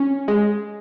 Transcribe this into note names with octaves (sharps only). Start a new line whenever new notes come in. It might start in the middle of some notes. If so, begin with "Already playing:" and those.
Already playing: C#4
G#3